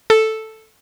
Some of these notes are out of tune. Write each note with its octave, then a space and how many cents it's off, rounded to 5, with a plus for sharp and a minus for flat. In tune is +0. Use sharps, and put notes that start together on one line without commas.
A4 +0